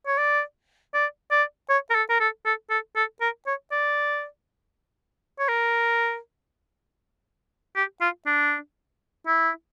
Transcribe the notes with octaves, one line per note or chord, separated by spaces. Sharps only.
C#5
D5
D5
D5
C#5
A#4
A4
A#4
A4
A4
A4
A4
A#4
C#5
D5
C#5
A#4
G4
F4
D4
E4